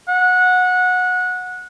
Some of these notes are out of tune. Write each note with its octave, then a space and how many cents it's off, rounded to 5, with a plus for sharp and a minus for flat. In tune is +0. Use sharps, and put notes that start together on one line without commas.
F#5 -20